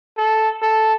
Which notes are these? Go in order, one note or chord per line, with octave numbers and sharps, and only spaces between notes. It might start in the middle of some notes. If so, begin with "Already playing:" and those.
A4
A4